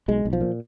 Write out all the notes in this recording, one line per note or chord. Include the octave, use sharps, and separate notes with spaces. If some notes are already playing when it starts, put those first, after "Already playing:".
B1 G#3
B1
F3
A#2